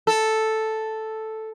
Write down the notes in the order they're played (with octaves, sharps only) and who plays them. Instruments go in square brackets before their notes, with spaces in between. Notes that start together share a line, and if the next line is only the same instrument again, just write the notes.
[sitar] A4